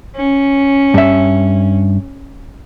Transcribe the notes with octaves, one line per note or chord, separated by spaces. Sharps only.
C#4
G2 E5